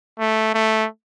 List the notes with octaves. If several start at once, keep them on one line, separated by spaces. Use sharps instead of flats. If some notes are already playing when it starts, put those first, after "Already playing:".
A3
A3